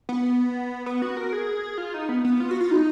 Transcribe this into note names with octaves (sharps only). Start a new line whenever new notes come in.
B3
B3
F#4
A#4
G#4
F4
D#4
B3
B3
F4
F#4
F4
D#4